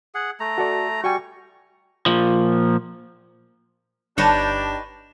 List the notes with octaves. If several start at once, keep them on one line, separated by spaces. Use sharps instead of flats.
G#4 F#5
A3 A#5
F#4 A4 D5
G3 F#4 G5 G#5 C#6
A#2 F3
G1 D4 D#4 G4 B4 C#5 A5